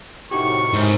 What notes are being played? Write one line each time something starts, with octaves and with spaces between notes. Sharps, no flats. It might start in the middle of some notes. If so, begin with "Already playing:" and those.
A2 C3 D#3 D#4 F#4 G4 C#6
G#2 D#4 A#4 C5